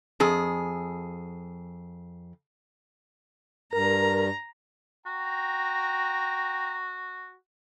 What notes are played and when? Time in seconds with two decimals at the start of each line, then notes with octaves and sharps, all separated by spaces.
0.20 F2 G#4
3.73 G2 A#4 A#5
5.06 F#4 G5 A#5